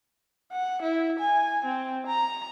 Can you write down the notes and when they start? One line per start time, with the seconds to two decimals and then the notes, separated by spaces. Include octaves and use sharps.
0.52 F#5
0.82 E4
1.19 G#5
1.64 C4
2.06 A#5